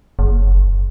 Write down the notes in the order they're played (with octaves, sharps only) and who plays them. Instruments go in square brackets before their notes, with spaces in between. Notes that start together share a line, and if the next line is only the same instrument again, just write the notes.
[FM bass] F#1